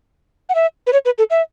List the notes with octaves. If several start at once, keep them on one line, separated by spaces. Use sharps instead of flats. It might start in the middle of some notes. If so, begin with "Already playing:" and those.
F#5
E5
B4
C#5
B4
A4
E5